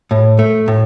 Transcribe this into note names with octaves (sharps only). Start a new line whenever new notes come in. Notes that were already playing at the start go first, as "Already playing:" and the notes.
A2
A3
A2